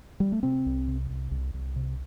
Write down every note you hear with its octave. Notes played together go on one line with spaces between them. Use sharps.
G3
A3
C3 C4
C2
C3
C2
C2
C2
C3